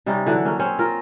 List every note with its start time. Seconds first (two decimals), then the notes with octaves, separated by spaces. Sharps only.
0.06 C3 G3 C#4 D#4
0.26 D3 E3 F#3
0.45 A#3 C#4
0.59 C4 C#4 C5
0.79 F4 A#4